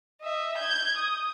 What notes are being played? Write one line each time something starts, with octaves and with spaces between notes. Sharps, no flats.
D#5 E5
G6 G#6
D#6